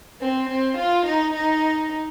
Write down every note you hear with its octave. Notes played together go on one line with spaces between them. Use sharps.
C4
C4
F4
D#4
D#4